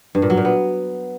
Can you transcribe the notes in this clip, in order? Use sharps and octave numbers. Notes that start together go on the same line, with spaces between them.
G2
A#2
F#3
A#2
B3